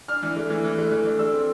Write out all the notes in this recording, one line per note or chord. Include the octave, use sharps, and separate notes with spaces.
D4 F6
E3
A3
E3
E3
A3
E3
D4
A3 E6
C4